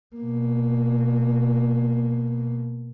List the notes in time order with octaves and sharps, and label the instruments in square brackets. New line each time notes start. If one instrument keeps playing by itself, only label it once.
[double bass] B2 A#3